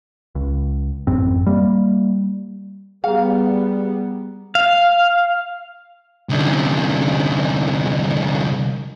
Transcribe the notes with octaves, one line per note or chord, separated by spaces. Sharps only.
C#2
A1 F#2 C4
G3 A#3
G3 B3 G#4 F5 A#5
F5
C2 D3